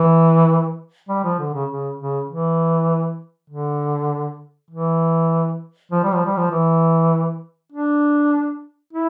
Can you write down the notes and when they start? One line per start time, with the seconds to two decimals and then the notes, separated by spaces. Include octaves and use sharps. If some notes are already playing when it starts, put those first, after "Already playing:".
Already playing: E3
1.09 G3
1.24 F3
1.39 D3
1.54 C#3
1.70 C#3
1.99 C#3
2.30 E3
3.50 D3
4.71 E3
5.92 F3
6.03 G3
6.14 F3
6.26 G3
6.37 F3
6.52 E3
7.72 D4
8.93 E4